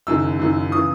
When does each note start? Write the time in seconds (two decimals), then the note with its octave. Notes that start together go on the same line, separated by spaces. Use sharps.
0.07 F#1 F#2 D#3 E6
0.40 F#1 F#2 D#3
0.72 C#3 E3 D#6